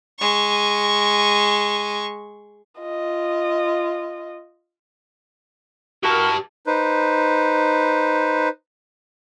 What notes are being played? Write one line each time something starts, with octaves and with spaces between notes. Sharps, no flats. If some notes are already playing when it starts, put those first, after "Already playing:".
G#3 C#6
F4 D#5
E4 F#4 G4 A#4 A5
D#4 B4 C5